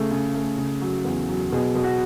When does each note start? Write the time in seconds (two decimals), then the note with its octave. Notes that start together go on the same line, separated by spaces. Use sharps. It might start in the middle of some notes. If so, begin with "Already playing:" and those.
Already playing: C#3 A3 G#4
0.11 C#3
0.34 A3
0.58 C#3
0.81 F#3
1.04 E2
1.29 F#3
1.52 B2 G#4
1.75 B2
1.84 F#4